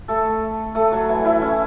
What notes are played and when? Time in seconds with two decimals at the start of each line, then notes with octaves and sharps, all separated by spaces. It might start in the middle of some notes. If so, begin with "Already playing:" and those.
0.08 A3 A4
0.75 A3 A4
0.92 F#3 F#4
1.09 E3 E4
1.25 E3 E4
1.42 C#4